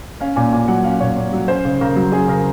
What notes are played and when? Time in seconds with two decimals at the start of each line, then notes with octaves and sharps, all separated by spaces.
0.21 C#4 F5
0.36 A#2 G#5
0.53 A#2 G#5
0.68 F#3 F#5
0.84 C#4 F5
1.00 A#2 C#5
1.16 A#2
1.33 F#3
1.48 C#4 C5
1.65 C#3
1.81 C#3 A#4
1.96 F#3
2.12 C#4 G#4
2.28 C#3 A#4